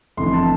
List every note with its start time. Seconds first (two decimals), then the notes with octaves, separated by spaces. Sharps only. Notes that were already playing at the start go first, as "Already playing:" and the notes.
0.17 G1 F2 C3 E3 A3 C6
0.33 A5